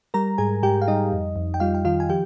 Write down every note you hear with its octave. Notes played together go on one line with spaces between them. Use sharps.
G3 A#4 A#5
G#2 G#4 G#5
G#2 G4 G5
F5
G3 D#4 D#5
F2
F2
G5
G3 F4 F5
G5
D#3 F4 F5
G#5
F3 G4 G5